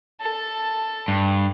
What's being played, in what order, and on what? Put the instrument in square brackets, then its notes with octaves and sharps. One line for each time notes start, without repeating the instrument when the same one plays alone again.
[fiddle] A4 A5
[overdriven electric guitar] G2